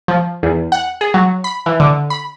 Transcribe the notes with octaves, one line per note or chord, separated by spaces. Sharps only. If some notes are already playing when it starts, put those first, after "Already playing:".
F3
E2
F#5
G#4
F#3
B5
E3
D3
B5